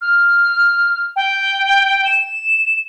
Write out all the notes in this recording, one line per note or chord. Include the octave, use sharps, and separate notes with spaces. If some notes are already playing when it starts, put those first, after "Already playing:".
F6
G5
E7